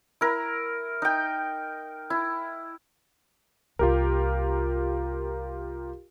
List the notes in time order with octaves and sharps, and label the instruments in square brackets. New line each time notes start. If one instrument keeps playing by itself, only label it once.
[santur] E4 A#4
D#4 G5
E4
[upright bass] C2 A#3 [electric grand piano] F4 G4 A#4